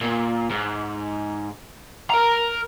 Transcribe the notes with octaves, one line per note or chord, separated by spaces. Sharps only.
A#2
G#2
A#4 A#5